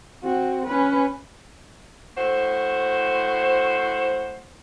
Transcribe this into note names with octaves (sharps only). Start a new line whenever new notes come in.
C4 F#4
C#4 B4
A2 F#4 C5